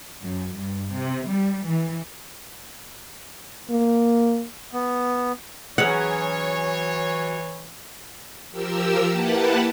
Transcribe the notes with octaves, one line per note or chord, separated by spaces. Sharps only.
F#2
G2
C3
G3
E3
A#3
B3
E3 F#3 C#4 G#4 C#5 F#5
F3 G4 A#4 E6
A#3 E4 G4 B4 F#5 A5